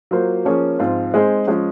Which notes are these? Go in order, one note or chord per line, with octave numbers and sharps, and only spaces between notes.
F#3 A#3 F4 C5
F3 A#3 C#4 G#4 C#5
G#2 F3 C4 F4
G#3 C4 D#4 G#4 C5
F3 G#3 C#4